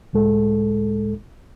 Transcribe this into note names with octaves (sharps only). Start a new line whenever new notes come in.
C#2 A2 G#3 A4